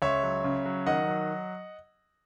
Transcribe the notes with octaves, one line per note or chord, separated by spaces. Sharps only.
C#2 C#5 E5
F#3
C#3
F#3
D#3 D#5 F#5
F#3